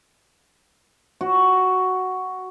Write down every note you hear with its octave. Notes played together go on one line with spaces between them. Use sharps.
F#4